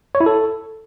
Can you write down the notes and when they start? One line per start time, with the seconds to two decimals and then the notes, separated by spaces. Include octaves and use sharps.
0.15 C#5
0.20 E4
0.26 A4